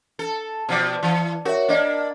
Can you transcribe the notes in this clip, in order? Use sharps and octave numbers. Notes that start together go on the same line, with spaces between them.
A4
B2 F3 D5
E3
F#4 A#4 C#5 E5
A#3 D4 D5 D#5